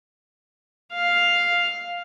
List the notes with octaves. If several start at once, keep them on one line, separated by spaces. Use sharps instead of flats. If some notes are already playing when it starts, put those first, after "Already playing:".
F5